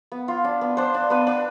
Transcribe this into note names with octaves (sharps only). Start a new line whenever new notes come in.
B3
F4
D4
B3
D4 C5
D4
B3 B4
D4